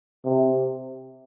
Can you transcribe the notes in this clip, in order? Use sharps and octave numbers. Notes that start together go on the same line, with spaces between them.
C3